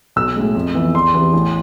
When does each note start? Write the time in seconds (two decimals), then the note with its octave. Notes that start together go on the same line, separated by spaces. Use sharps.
0.16 B1 E6
0.36 A2 G#3
0.55 F2
0.75 E3 B3
0.94 E2 C6
1.14 C3 E3 B3
1.33 A1